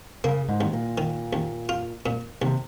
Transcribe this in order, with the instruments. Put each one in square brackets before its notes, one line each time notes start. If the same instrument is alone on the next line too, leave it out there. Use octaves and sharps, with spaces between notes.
[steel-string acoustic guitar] C#3 [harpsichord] A#3
[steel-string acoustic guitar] G#2
[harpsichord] D#2
[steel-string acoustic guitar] A#2
[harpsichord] D#3
D#2
F4
A#2
[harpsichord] D#2 [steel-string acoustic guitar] C3